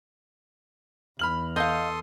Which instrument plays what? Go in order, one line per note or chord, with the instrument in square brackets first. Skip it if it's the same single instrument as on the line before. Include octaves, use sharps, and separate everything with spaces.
[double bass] E2 [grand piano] B5 F6 F#7
[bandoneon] A4 C6 D#6 [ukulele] D#5 F5 [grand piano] G6